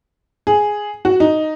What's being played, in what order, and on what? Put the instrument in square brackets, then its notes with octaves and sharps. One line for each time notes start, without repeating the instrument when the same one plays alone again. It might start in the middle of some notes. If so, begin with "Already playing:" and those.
[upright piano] G#4
F#4
D#4